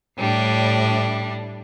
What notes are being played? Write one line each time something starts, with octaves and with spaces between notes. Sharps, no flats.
A2 G3 D4